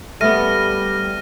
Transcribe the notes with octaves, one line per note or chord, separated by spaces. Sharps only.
G3 A3 B3 F6 A#6 D#7